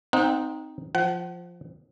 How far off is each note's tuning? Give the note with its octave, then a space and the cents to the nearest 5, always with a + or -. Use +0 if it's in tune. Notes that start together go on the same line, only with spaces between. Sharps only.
C4 +0 D#4 +0 F#5 -35
F3 +0 F#5 +35